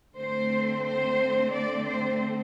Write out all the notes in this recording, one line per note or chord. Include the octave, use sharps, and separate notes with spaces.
D3 A3 C4 C5
C5
D5
C5